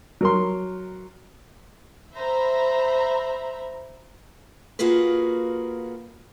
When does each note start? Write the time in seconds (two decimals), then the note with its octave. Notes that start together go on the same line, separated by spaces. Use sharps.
0.21 F#3 A#4 C6
2.15 C5 E5 A#5 B5
4.79 A#3 F4 F#4 G#4 B4